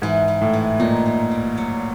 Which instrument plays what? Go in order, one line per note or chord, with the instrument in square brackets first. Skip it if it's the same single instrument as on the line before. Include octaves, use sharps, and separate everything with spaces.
[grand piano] G#2 [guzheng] E3
[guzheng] E3
[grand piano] A2
[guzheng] E3
[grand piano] A#2 [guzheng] D#4
[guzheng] D#4
G3
F#3